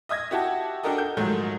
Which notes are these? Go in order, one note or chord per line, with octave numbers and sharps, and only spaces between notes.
D#5 E5 D#6 G#6 A#6
E4 F#4 G4 A5
D4 F#4 G4 A4 A#4 D#5
G6
G#2 D#3 F3 F#3 A3